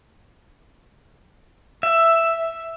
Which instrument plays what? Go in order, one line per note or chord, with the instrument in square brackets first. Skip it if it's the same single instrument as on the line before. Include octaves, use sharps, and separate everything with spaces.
[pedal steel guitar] E5